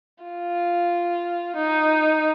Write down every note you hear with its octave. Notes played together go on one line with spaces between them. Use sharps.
F4
D#4